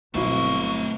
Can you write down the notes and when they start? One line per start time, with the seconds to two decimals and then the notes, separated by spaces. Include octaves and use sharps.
0.14 G1 B2 F#3 A3 C4 E4 F5 C#6